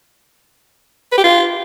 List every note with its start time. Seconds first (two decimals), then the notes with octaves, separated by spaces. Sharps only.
1.12 B4
1.18 G4
1.24 F4